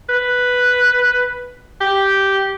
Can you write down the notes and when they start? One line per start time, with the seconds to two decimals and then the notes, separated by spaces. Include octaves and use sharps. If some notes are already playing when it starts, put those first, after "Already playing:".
0.09 B4
1.81 G4